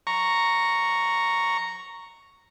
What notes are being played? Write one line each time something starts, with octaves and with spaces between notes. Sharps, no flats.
A#5 C#6